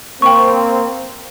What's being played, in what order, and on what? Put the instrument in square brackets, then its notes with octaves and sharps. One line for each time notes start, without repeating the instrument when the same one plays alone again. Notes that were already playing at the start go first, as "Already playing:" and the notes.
[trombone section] A#3 C4 [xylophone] G5 C#6